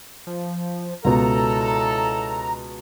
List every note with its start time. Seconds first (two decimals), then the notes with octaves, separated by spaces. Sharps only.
0.27 F3
1.04 C#2 B2 C#4 E4 A4 A#5